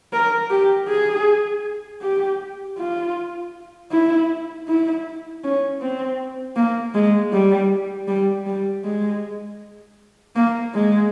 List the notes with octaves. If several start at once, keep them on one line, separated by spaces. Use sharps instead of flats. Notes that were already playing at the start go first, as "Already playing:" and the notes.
A#4
G4
G#4
G4
F4
E4
E4
C#4
C4
A#3
G#3
G3
G3
G3
G#3
A#3
G#3